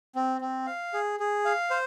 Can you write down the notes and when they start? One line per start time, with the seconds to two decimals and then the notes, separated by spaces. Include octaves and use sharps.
0.15 C4
0.41 C4
0.67 F5
0.93 G#4
1.20 G#4
1.45 F5
1.71 C5